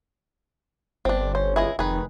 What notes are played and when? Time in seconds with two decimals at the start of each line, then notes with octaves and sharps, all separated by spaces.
1.05 G1 C4 D4
1.35 C#4 C5
1.56 C#2 E4 G#4 D#5
1.79 F1 D#3 G#4 B4